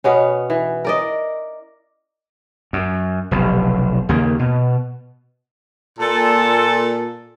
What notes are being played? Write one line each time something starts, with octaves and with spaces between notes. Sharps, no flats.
B2 B3 C#4
E3
A#4 D5 D#5
F#2
F1 B1
D#2 C#3 A#3
B2
A#2 A4